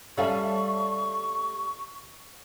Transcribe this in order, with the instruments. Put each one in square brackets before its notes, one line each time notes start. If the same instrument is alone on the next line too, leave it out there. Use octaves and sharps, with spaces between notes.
[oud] G3 A3 C#4 [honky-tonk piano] E5 F5 A5 [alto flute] C#6